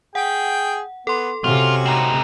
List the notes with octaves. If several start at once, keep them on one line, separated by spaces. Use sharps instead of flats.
G#4 F#5 G5
B3 A4 C6
C3 C#4 F4 F#4
C4 D#4